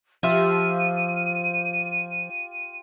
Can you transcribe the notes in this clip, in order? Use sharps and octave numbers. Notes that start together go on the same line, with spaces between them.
F3 F4 G4 E5 F5 D#7